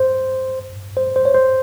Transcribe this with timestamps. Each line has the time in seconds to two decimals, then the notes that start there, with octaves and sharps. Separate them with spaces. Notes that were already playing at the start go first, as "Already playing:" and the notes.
Already playing: C5
0.97 C5
1.16 C5
1.25 C#5
1.35 C5